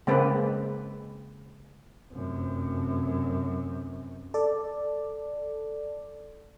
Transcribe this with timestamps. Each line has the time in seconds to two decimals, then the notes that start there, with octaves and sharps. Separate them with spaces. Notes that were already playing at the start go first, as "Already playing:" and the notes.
0.07 C#3 G#3 A#3 C4 B4
2.12 F1 F#2
4.34 A4 D5